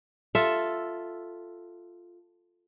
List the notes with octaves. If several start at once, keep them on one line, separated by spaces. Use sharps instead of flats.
F4 A4 E5